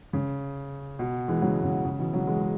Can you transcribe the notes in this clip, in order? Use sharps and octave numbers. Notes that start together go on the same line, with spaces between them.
C#3
B2
E3 G#3
C#3 F#3
C#3
C#3
B2 E3
C#3 F#3
E3 G#3
G#3